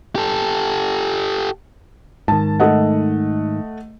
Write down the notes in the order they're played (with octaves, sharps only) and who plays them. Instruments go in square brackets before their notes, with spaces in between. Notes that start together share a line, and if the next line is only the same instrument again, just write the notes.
[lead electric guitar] G4 A4
[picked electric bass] G#2 D#3 [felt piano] A5
[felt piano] A3 D#5 F#5